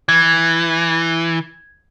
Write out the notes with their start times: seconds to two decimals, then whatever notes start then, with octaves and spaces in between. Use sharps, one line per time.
0.09 E3 G#6